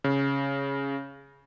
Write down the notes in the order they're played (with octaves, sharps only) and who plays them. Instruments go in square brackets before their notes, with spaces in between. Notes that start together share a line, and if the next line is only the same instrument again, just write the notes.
[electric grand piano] C#3